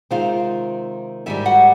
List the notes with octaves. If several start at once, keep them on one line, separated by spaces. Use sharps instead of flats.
C3 D#3 G#3 C4 F4 F5
G#2 D#3 G3 E4 E5
F#4 F#5